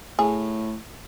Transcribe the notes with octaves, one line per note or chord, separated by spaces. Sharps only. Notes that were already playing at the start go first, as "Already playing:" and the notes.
A2 G#4